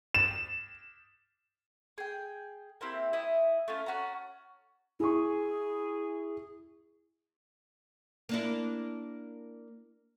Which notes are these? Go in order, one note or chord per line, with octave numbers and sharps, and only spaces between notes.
E7
G#4 G5
A#3 C4 E4 G4
E4 D#5
A3 C#4 F4
C#4 F#4 A5 A#5
E4 G#4 C#6
A#3 D4 E4